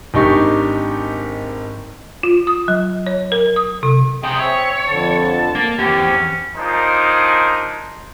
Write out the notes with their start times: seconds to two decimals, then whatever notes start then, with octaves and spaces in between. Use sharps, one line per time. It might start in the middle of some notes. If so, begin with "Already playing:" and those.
0.14 G#1 D4 D#4 G4 C#6
2.23 F4
2.47 D#6
2.68 F#3
3.07 C#5
3.32 A#4
3.56 D#6
3.83 C3
4.23 B1 C3 G#4 G5
4.39 C4 C#5 E5
4.88 F2 D3 A5
5.55 A#3
5.79 E2 C4 C#4 G4
6.57 D4 D#4 F4 G#4 A#4 C5